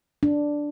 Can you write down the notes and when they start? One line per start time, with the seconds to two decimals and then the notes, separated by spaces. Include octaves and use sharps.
0.23 D4